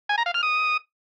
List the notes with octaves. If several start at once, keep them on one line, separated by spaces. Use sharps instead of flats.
G#5
A#5
F5
F6
D#6